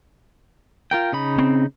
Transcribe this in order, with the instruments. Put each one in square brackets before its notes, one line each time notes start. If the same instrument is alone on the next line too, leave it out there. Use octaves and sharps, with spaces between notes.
[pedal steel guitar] F4 A#4 G5
C#3 D#4 B5
[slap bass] C4